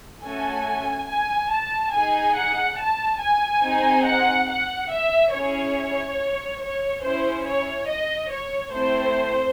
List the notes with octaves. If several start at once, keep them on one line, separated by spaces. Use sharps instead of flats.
A3 C#4 F#4 A4 G#5
G#5
A5
D#4 G#4 G#5
F#5
A5
G#5
C4 D#4 G#4
F#5
F#5
E5
C#4 E4 G#4 C#5
C#5
C#4 E4 G#4 C5
C#5
D#5
C#5
A3 C4 E4 C5